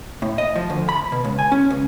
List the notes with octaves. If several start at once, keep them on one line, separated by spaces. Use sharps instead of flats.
A2
D#5
F3
D2
B5
B2
C#2
G#5
C#4
C#2